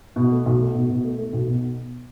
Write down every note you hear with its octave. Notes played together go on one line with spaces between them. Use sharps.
B2
A3
B1
A3
B2
B2
A3
A3
B1
B2